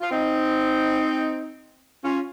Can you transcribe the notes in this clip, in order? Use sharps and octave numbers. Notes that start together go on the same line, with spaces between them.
F4
C4 D#4
C#4 F4